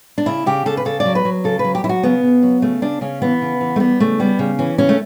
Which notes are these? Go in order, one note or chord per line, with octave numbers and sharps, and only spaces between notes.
D4
C#3 E4
C#3 G4
C#3 A4
B4
C#3 A4
D5
F#3
B4
F#3
C#3 A4
B4
F#3
G4
F#3 E4
F#4
C#3 B3
C#3
F#3
C#3 A3
C#3 D4
C#3 C#4
E3 B3
C#3
E3
A3
G3 B3
C#3 A3
G3 B3
C#3
E3 C#4
C#3 C#4
A3